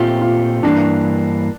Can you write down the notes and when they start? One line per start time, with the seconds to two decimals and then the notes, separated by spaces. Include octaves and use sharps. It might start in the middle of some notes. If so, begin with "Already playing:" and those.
Already playing: A#2 A3 C4 F4 G4
0.21 F4
0.63 G2 E3 A#3 D4